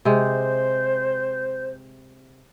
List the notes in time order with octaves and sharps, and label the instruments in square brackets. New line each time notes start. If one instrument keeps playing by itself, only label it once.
[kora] C3 G#3 [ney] C5